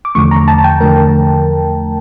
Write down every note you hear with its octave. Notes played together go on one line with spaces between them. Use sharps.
D6
E2 D3 F3 A3 C#6
A#5
A5
G5
E2 D3 F3 A3 A#4